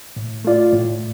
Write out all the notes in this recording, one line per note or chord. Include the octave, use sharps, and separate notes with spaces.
A2
A3 F4 D5
A2